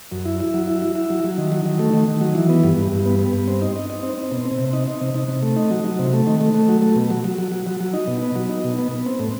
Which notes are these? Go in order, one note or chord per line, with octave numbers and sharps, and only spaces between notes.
F#2
E4
E4
F#3
E4
E4
E4
F#3
F#3
D#3
F#3
D#3
A3
D#3
D#3
F#3
E3
B3
G2
G2
G2
B3
B3
G2
C4
D#4
D#4
D#4
C4
C4
B2
C4
C3
D#4
D#4
C3
C3
C3
A3
D#4
F#3
F#3
C3
A3
D#3
A3
A3
F#3
A3
B2
F#3
F#3
F#3
F#3
F#3
F#3
D#4
B2
B3
F#3
D#4
B2
B3
B3
C4
A2